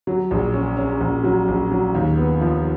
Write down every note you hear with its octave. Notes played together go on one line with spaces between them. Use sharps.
F#3
A#1
C#4
C#4
A#1
F#3
A#1
F#3
D#2
B3
F3